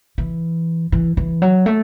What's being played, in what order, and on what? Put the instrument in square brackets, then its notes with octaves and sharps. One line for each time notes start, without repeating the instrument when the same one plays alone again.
[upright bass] E3
E3
E3
F#3
A3